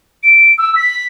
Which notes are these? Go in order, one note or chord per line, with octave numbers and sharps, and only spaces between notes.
D7
E6
B6